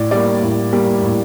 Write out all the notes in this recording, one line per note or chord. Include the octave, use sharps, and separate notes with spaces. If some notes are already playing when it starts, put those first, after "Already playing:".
Already playing: A2 D5
G3 A#3 D5
A2
G3 A#3
A2